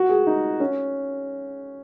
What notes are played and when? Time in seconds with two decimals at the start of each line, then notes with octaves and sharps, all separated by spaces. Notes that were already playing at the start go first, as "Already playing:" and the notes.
Already playing: F#4
0.09 G#4
0.27 D#4
0.60 C#4